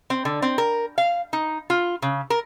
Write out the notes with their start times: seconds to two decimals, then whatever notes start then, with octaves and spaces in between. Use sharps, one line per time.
0.10 C4
0.25 D3
0.42 C4
0.58 A#4
0.98 F5
1.33 D#4
1.70 F4
2.02 C#3
2.30 A#4